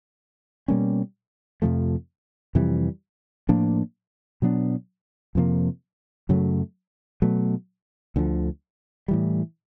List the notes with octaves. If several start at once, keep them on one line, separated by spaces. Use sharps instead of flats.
B2 G3 A#3 C#4
F2 C3 F3 A3
F2 C3 E3 G3
A2 F3 A#3 D4
B2 F#3 B3 D4
F2 C3 F3 A#3
F#2 C#3 F#3 A3
B2 F#3 A3
D2 D3 F3
A2 E3 G3